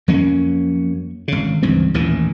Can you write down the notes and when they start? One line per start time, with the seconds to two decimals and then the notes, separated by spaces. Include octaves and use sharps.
0.08 F2 F#3 A#3 C#4
1.28 G#1 C#3
1.62 C#2 G2 E3 C4
1.94 A1 D#2 A#2 E3